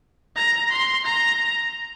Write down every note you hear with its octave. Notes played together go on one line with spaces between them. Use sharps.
A#5
C6
A#5